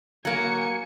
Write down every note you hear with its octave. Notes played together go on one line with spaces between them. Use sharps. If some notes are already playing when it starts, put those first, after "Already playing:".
F#3 A#3 G#5 C#7